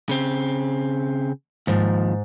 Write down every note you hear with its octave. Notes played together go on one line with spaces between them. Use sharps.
C#3 C4
D#2 G#2 F3